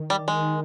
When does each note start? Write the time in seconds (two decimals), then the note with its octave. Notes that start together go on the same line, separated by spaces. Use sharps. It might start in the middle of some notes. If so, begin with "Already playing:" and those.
Already playing: D#3
0.10 G3
0.28 G#3